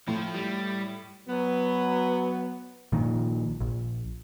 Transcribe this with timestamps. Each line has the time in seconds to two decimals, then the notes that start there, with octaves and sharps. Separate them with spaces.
0.08 A2 F3
0.34 G3
1.28 F#3 B3
2.92 A#1 A#2 D#3
3.61 A#1